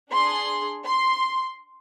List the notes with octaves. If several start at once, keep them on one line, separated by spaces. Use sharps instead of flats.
D4 G#4 C6
C6